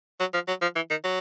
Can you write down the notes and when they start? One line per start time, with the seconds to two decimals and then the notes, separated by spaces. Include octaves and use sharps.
0.20 F#3
0.34 F3
0.48 F#3
0.62 F3
0.76 E3
0.90 D#3
1.04 F#3